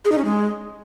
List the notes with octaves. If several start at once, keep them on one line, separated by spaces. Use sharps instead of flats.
G#4
D#4
C#4
G#3